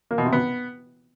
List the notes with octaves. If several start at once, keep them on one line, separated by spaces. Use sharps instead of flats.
A#3
B2
C3
B3